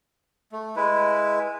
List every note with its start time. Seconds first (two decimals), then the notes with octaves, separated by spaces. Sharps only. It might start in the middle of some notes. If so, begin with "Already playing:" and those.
0.52 A3
0.76 G#3 E4 B4